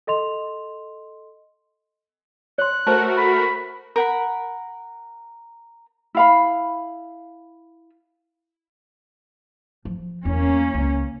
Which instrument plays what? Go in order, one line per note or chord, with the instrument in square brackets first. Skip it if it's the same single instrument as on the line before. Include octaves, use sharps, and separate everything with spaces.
[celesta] A4 D#5 C6 F7
[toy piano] C#5 C6 [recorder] F#6
[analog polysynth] A3 F#4 A#4 [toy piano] C5 A5
[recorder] B5
[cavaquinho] A#4 F#5 B5
[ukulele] E4 F5 B5
[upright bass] F3
[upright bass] E2 E4 [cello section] A#3 C#4
[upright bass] C#2